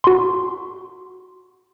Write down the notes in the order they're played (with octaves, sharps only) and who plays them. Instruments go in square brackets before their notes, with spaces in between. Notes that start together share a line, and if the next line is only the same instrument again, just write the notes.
[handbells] F#4 C6